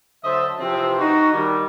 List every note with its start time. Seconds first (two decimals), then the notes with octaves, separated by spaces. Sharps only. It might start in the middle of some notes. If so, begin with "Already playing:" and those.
0.24 D3 F#3 C5 D#5 E5 A5
0.59 C3 E3 F3 C4
0.99 D#4 F#4
1.33 D#3 G3